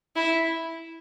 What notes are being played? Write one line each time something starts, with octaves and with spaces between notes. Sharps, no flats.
E4